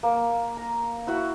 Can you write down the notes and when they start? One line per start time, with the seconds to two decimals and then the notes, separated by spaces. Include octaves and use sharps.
0.03 A#3
0.57 A#5
1.07 E4 F#4 F#5